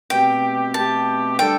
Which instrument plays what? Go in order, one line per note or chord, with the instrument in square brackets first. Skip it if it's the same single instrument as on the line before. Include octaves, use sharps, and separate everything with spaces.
[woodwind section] B2 A3 C4 G4 [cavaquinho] G5
[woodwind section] B2 A3 C4 G4 [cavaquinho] A5
[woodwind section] D3 G3 D4 A4 [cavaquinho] G5